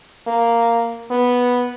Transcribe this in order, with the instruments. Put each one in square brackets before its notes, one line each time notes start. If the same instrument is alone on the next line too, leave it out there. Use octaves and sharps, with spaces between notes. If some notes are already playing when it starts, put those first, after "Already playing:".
[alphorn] A#3
B3